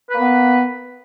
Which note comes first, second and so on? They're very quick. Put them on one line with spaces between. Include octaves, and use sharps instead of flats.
B4 A#3 B3